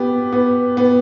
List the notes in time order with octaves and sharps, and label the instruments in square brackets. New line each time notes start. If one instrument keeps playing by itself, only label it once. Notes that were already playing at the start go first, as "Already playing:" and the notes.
Already playing: [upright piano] B3 [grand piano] G4
[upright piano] B3
B3